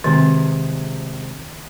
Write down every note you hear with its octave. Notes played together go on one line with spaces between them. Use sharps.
C3 D#3 G#3